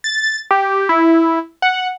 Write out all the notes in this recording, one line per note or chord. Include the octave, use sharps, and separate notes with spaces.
A6
G4
E4
F#5